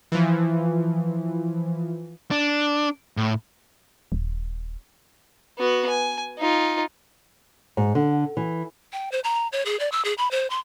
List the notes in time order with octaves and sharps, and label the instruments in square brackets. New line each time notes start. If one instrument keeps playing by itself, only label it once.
[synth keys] E3 F3
[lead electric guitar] D4
A2
[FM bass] D#1
[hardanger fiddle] B3 F#4
G#5
D#4 F4
[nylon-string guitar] G#2
D3
E3
[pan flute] G5
C5
A#5
C#5
G#4
D5
E6
G#4
B5
C5
C6